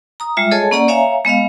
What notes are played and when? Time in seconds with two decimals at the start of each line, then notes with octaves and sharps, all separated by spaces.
0.20 A#5 D#6
0.37 G3 G#3 F4 E5
0.51 G#4 A4 C#5 D#5 G#5 A5
0.71 A#3 C#4 D5 F#5 A#5
0.88 C#5 E5 F5 G#5 A#5
1.25 G#3 B3 D#5 F5